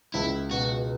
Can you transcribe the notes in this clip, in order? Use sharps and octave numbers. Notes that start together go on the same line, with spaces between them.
C#2 E4
B2 F#4